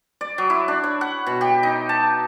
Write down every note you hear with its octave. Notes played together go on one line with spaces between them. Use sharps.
D5
F#3
E4
D4
C#5
F#5
B2
G4
D#4
A5